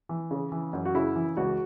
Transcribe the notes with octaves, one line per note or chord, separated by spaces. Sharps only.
E3
C#3
E3
F#2
F#4
C#3 E4
E3
C#2 F#4